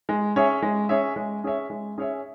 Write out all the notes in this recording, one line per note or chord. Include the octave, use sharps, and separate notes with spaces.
G#3
C#4 G#4 C#5 E5
G#3
C#4 G#4 C#5 E5
G#3
C#4 G#4 C#5 E5
G#3
C#4 G#4 C#5 E5